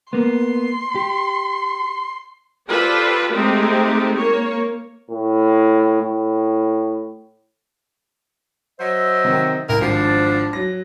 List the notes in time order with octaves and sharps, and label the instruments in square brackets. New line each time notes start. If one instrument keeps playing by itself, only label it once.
[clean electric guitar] A#3 B3 [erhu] C6
[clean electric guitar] G4
[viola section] F4 G4 A4 B4 C5 D5
G#3 A3 C4 D#4 G4
A#3 C#5
[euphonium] A2
A2
[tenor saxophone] F#3 [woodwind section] C5 D#5 E5
[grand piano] C3 D#3
[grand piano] C2 [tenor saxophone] A#4
[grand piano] G#1 [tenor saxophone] F3 [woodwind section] D4
[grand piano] F#3 A#6